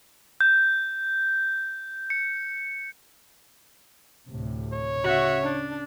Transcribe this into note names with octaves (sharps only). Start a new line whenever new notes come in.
G6
C#7
D2 A2 C3
C#5
C#3 F#4 E5
D4